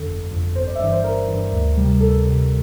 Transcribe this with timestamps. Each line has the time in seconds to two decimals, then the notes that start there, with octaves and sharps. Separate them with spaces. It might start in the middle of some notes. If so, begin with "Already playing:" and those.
Already playing: F2 D3 A4
0.08 G1
0.31 F2 D3
0.55 G1 C5
0.67 D5
0.75 E5
0.79 G2 E3 D5
0.92 C5
1.04 G1 A#4
1.28 G2 E3
1.52 D2
1.76 C3 G3
2.00 D2 A4
2.24 C3 G3